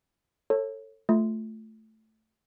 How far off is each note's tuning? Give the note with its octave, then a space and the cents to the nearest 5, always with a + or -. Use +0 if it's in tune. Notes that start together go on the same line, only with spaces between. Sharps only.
A4 +25 C#5 -20
A3 +0 F4 +0